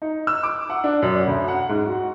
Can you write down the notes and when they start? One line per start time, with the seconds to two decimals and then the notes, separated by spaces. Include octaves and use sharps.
0.02 D#4
0.27 E6
0.43 D6
0.70 F#5
0.84 D4
1.02 F#2
1.27 D2
1.48 F#5
1.69 G#2
1.86 F#4